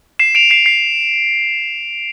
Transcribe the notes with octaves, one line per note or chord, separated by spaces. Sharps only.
C7 E7
D7 F7
C7 E7
C7